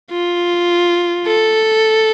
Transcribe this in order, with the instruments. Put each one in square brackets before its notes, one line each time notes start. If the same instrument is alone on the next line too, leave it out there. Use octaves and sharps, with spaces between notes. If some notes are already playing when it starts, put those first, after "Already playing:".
[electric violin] F4
A4